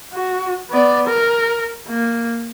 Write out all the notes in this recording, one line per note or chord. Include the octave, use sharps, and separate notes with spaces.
F#4
B3 D5
A#4
A#3